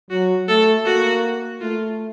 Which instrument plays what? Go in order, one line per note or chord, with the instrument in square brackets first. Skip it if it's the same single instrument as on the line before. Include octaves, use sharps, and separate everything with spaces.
[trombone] F#3 [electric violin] F#4
[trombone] A3 [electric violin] A4
[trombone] A#3 [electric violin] F#4
[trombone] A3 [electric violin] F4